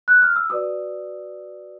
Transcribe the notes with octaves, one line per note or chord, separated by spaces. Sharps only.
F#6
F6
E6
F#4 B4 D5 D#6